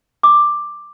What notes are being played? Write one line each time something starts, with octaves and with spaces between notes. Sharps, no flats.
D6